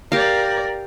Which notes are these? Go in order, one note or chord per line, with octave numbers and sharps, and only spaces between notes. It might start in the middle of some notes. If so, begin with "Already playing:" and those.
G4 A#4 D5 F5